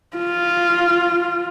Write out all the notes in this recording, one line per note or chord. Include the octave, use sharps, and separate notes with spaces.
F4